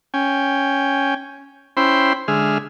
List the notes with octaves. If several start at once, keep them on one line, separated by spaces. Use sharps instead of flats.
C#4 G5 G#5
C#4 E4 C5 G5 B5 C6
D3 G#3 G#4 E5 F6